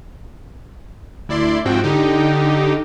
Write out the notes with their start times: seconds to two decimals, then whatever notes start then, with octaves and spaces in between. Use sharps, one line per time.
1.29 D2 E4 D5 C6
1.65 G#2 F3 C4 F#4 G5
1.84 D3 D#4 G4